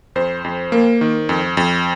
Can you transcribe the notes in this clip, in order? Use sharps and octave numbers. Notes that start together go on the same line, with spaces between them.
F2 C5
F2
A#3
D#3
F2
F2